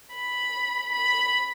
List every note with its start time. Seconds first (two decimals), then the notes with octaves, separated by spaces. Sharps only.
0.15 B5
0.93 B5